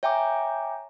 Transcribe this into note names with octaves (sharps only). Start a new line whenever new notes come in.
C#5 E5 G5 G#5 A#5 D6